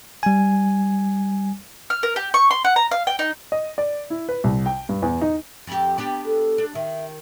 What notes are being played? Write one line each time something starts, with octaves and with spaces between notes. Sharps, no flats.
G3 G#5
F6
A#4
G4
C#6
C6
F#5
A#5
F5
G5
D#4
D#5
D5
E4
B4
C2
G5
G2
E2
D#4
F2 G4
B3 D4 G4
A4
D4
D#3 E5